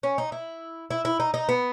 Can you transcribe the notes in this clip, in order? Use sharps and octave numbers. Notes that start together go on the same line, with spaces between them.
C#4
D#4
E4
E4
E4
D#4
D#4
B3